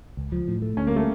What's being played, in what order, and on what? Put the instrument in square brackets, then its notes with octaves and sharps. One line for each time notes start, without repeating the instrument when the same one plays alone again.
[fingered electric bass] C#2
F3
A2
A3
[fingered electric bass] D2 [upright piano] C#4
[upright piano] A#3
[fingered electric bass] G3 [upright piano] A3